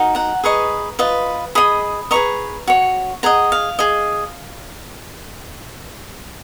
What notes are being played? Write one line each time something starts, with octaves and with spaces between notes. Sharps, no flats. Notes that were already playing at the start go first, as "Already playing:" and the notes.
Already playing: D#4 F#4 A#4
F#5 A#5
G#4 B4 D#5 A#5 C#6
F4 B4 D#5
G#4 D#5 B5 D#6
G#4 B4 D#5 A#5 C#6
F#4 C#5
G#4 D#5 F#5 A#5
F5
G#4 D#5